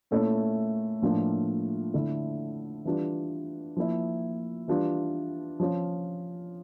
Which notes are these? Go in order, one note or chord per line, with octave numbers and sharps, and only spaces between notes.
A#2 A3 C#4 E4
A2 F3 A#3 D4 F4
D3 A3 E4
E3 G3 D4 F4
F3 A#3 E4
E3 G3 D4 F4
F3 C#4 F4